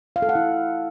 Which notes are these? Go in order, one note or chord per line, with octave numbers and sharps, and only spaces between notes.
F5
A4
F#5
E4